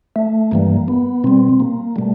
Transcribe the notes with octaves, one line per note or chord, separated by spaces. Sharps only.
A3
G2 E3 G3 A#3
B3
B2 G3 C4
A#3
B2 G3 A3